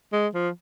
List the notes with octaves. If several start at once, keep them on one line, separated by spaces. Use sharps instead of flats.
G#3
F3